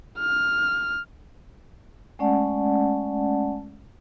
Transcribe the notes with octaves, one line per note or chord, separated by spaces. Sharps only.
F6
G#3 A3 C#4 D5 F#5 A5